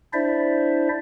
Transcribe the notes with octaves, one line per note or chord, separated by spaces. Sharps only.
D4 E4 C5 D5 E5